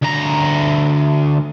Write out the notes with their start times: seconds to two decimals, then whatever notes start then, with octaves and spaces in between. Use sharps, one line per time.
0.03 D2 A#5